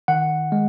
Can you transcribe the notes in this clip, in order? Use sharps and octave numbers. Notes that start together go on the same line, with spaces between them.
D#3 F#5
G#3